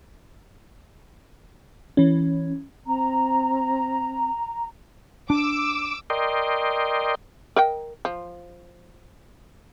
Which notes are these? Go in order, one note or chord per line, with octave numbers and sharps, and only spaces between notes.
E3 C#4
C4 A#5
D4 D6 E6
A#4 D5 D#5 G5 C6
A#4 D#5 G5
F3